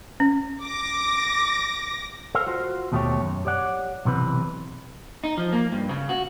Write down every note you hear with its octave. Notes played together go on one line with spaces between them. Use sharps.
C#4
D6 A#6
A4 A#4 C5 F5
F4 F#4 C5
D#2 B2 A3 F4 G4 C#5
F#2
G4 C#5 D5 F#5
B1 C3 E3 B4
D#4
F3
A#3
G2
C#3
F#4